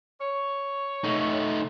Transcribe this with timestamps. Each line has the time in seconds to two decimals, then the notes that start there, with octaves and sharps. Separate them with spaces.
0.21 C#5
1.04 A3 D#4